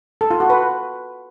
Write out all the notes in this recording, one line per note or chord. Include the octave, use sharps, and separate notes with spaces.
A4
F4
F#4
B4